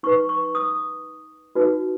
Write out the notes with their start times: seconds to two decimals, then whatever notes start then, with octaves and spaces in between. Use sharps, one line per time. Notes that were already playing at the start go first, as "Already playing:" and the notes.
0.03 D#4 B4 C#6
0.29 C#6
0.55 D#6
1.55 D#4 F#4 B4